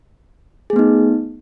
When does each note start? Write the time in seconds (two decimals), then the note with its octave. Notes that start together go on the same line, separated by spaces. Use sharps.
0.70 G#4
0.73 A3
0.76 B3
0.79 D#4